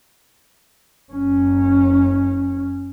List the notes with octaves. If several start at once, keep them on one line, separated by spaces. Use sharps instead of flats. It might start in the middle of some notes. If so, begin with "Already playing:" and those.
F#1 C#4